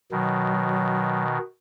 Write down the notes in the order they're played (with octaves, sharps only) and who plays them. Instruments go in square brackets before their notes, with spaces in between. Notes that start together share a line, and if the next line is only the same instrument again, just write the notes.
[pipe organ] B2 D#3 [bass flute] F#3